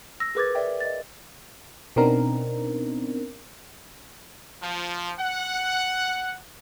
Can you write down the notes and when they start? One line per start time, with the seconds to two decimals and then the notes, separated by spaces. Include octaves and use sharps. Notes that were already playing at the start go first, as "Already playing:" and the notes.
0.20 E6 A#6
0.35 G#4 A#4 B4 D6 G#6 A6
0.55 A#4 D5 E5 G5
0.80 D#5 A6
1.96 B2 B3 C4 D4 D#4 A#4
4.63 F3
5.19 F#5